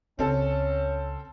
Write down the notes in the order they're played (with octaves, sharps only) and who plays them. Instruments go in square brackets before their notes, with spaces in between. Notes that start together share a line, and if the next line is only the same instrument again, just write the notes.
[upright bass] C#2 [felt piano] C4 A4 [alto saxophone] C#4